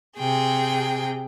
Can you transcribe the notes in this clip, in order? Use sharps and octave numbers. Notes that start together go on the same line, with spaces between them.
C3 G#4 G5